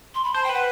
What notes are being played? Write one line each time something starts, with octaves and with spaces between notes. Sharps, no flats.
C6
B5
C5 A5
G5
B4 F#5